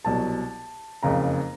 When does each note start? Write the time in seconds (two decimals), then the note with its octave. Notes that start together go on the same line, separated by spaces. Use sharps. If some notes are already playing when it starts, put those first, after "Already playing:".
0.05 C2 B2 F#3 A5
1.03 F#1 F2 C#3 A#5